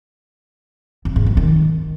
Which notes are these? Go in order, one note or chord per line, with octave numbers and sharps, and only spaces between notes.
F2
G#2
G2
D#3